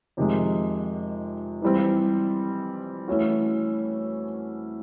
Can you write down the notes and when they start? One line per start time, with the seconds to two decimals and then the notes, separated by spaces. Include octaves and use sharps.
0.17 F2 C3 D#3 G#3
1.62 E3 G3 C4
3.08 E3 A3 C#4 F#4